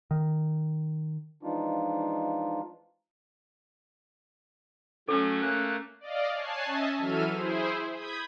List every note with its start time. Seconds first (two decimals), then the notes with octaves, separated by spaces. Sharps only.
0.11 D#3
1.43 E3 F3 G#3 D4 D#4 F4
5.09 F#3 A3 C#4 A4
5.41 A3 A#3 F#6
6.00 D5 D#5 F5
6.34 C#5 G#5 A5 F#6 C7
6.66 C#4 D#5 E5 G#5 A5
6.98 E3 F#3 A4 E5 F6 D#7
7.30 E4 G#4 C5
7.94 B5 D#6 G6 G#6 B6